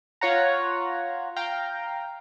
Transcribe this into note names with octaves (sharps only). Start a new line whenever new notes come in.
F4 C#5 F#5 A#5
F5 G5 A#5